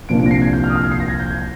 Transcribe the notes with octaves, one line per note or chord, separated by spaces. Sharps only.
C2 A#2 F3 A#3 D4 D7
D7
A#6
C7
G#6
G6
F6
D#6
F6
G#6
C7
A#6
G#6
G6
G#6